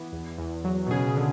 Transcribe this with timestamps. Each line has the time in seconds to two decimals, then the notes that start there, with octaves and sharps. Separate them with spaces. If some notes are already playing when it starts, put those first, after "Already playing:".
Already playing: E3 B3
0.12 E2
0.38 E2
0.64 F#3
0.86 B2
0.91 C#3 G#4
1.17 D3